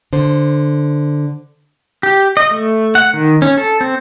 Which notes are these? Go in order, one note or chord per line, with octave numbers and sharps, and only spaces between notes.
D3 C5
G4
D#5
A3
F#5
D#3
C#4
A4
C4